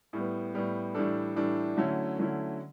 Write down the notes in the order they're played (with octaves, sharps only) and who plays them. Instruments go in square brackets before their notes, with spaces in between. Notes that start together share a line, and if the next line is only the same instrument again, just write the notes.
[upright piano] A2 G3 B3
A2 G3 B3
A2 E3 G3 D4 A4
A2 E3 G3 D4 A4
D3 F#3 A3 C#4 E4
D3 F#3 A3 C#4 E4